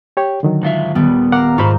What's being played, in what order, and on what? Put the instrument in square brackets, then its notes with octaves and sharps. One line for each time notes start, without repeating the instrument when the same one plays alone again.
[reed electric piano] G4 C#5 G5
D3 D#3 F#3
[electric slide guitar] G#2 F4 E5
[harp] D#1 G3 [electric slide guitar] B3
[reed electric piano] A#4 F#5 D6 [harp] F5 A#5
[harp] G#2 [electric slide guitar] F4 C5 [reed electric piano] B5 C#6